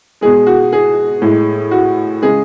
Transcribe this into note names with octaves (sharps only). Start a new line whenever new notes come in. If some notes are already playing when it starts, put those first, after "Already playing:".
B2 G#3 G#4
F#4
G#4
A2 G#3
F#4
C#3 G#3 G#4